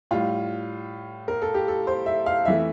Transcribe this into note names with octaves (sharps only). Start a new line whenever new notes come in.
A2 G3 F4
A#4
A4
G4
A4
C5
E5
F5
F2 E3 A3 E5